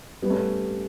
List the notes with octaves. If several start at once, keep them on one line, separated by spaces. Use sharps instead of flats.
G3 B3
A3 C#4